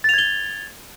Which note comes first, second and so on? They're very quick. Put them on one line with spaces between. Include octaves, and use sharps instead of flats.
A6 F7 G#6 G7